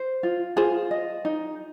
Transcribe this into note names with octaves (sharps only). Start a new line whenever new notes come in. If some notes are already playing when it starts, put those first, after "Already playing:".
Already playing: C5
F4
F4 G#4 C5
D#5
D#4